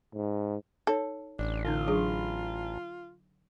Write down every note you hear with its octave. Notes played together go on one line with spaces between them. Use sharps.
G#2
D#4 A4 C#5
A1 D4
D3 D#4 F4
F#3 D4 G#4